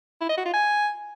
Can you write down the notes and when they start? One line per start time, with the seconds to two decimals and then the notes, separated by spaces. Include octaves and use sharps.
0.21 E4
0.29 D#5
0.37 F#4
0.45 F4
0.53 G#5